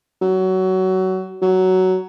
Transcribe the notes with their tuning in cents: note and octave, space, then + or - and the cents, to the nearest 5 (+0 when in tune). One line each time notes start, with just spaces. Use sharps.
F#3 +20
F#3 +10